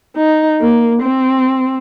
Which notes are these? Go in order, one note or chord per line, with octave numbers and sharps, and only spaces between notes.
D#4
A#3
C4